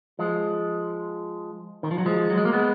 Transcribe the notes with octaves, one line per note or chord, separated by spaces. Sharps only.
F3 G#3
D#3
F3
F#3
F3 G#3
F#3
G#3
A#3
G#3 B3